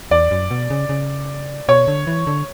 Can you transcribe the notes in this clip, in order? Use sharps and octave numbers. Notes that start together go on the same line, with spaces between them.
E2 D5
F#2
B2
C#3
C#3
B2 C#5
D3
E3
D3